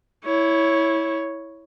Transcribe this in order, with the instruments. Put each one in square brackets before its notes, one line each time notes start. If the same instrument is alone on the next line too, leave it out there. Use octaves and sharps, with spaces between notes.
[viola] E4 C#5